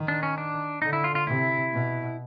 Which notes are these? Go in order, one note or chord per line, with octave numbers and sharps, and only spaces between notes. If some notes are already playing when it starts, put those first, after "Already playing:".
Already playing: D#3
D4
C#4
D4
D3 D#4
E4
F4
F4
C3 E4
B2